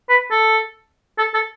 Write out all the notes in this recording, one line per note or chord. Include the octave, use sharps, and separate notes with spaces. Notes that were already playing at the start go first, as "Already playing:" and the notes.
B4
A4
A4
A4